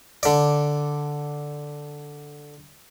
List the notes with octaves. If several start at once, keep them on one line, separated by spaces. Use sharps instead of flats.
D3 D5